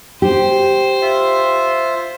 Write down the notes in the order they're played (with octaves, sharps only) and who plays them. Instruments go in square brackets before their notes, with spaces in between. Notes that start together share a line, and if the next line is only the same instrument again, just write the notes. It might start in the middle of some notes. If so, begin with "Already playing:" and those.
[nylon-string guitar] G4 [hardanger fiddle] C5
[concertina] F4 E5